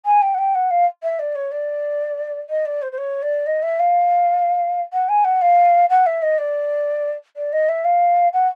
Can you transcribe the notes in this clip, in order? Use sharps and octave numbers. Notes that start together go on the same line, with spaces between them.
G#5
G5
F#5
G5
F#5
F5
E5
D5
C#5
D5
D#5
D5
C5
C5
C#5
D5
D#5
E5
F5
F#5
G#5
F#5
F5
F#5
E5
D#5
D5
D5
D#5
E5
F5
F#5